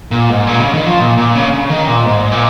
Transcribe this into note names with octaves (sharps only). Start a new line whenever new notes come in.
A#2
G#2
A#2
C#3
D#3
F3
A#2
A#2
C#3
C#3
D#3
A#2
G#2
A#2